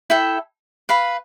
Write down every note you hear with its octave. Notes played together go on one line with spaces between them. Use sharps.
E4 A4 E5 G5
B4 F5 B5